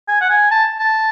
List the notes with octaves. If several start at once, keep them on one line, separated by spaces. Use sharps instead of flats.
G#5
F#5
G#5
A5
A5